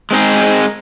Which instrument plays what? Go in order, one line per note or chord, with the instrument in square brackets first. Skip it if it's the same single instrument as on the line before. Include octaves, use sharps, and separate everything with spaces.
[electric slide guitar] G#3 C4 D#4 G#4